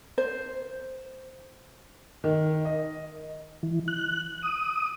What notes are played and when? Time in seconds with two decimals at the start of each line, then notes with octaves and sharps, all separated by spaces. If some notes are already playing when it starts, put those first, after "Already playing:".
0.18 C5
2.24 D#3
2.65 D#5
3.63 E3
3.88 F#6
4.42 D#6